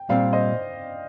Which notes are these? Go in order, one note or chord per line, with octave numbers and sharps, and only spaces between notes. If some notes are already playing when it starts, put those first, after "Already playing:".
Already playing: G5
A#2 G3 C4 D5 F5
C5 D#5